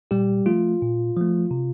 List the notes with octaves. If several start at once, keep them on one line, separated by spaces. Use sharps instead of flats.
A#2 G3 G4
F3 A3 F4
A#2
F3 A3
C3